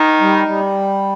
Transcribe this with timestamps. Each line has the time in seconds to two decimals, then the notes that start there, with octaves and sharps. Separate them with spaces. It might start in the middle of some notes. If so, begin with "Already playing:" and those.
Already playing: D#3 D#4
0.21 G3
0.48 G3